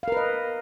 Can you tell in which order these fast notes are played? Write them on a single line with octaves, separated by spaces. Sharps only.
F5 A#4 B4 D#5